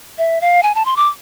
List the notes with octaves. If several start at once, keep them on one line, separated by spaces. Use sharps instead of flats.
E5
F5
G#5
A5
C6
D6